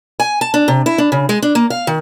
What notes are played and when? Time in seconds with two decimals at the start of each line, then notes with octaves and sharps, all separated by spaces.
0.20 G#5
0.41 A5
0.54 D4
0.68 C3
0.86 E4
0.98 D4
1.12 C#3
1.29 G#3
1.42 D4
1.55 A#3
1.70 F5
1.87 D#3